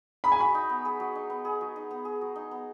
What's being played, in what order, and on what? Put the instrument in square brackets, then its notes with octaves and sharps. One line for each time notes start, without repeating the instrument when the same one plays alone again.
[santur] G#4 [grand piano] B5
[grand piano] G#5
[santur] F#3 [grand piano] B5
[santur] D#4
B3
G#4
F#3
D#4
B3
G#4
F#3
D#4
B3
G#4
F#3
D#4
B3